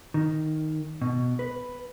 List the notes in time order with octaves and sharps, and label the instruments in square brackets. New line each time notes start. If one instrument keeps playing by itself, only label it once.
[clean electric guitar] D#3
B2
B4